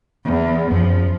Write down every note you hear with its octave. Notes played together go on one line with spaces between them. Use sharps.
E2
F#2 F3